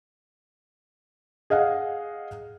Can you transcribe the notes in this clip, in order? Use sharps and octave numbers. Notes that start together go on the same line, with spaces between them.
G#4 D#5 F5 F#5